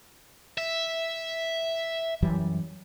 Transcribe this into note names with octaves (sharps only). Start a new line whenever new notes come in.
E5
F#2 E3 G3